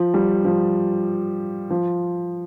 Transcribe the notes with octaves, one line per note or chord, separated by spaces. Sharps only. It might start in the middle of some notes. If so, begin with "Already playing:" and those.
Already playing: F3
G3
F3
F3